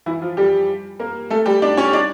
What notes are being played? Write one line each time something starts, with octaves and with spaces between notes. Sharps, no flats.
E3 E4
F3 F4
G3 G4
A#3 A#4
A3 A4
G3 G4
D4 D5
C#4 C#5
D4 D5